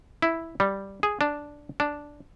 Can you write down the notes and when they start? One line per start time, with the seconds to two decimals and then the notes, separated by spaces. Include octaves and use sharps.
0.22 E4
0.60 G3
1.03 G#4
1.21 D4
1.80 D4